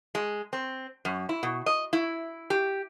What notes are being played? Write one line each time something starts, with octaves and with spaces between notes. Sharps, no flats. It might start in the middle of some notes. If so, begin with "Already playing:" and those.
G#3
C4
F#2
E4
B2
D#5
E4
G4